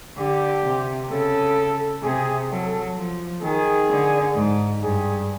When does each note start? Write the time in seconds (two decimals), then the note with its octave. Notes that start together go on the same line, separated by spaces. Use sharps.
0.17 D3 G4
0.64 C3
1.11 C#3 A4
2.03 C3 G#4
2.50 F#3 A4
2.96 F3
3.42 D#3 G#4
3.89 D3
4.35 G#2
4.82 G2 G#4